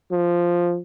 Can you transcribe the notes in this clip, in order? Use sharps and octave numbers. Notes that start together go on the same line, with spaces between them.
F3